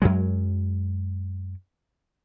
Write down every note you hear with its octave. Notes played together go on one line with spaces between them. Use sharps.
F#2 F#3 G#3